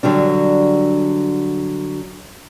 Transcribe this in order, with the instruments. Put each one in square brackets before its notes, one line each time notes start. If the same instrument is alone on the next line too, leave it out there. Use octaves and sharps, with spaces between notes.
[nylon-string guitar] D3 F#3 G3 D4